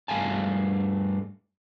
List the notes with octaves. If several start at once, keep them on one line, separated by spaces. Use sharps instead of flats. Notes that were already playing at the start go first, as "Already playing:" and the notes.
G2 G3 A3 F5 G#5 A5